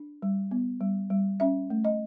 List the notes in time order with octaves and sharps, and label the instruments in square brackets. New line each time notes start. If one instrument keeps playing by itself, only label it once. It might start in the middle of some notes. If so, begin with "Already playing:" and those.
Already playing: [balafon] D4
G3
B3
G3
G3
C#4 E5
A3
D#5